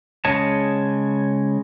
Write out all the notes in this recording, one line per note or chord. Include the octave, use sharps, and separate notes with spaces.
C#3 G#3 C#5 D#5 A5